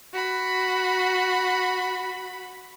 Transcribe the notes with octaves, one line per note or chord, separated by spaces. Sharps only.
F#4 B5